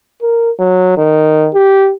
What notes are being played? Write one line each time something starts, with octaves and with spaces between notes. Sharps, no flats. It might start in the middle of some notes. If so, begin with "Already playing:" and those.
A#4
F#3
D#3
G4